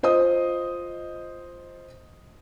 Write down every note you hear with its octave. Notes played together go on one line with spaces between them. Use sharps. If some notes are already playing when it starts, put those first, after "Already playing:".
F4 C5 D#5 D#6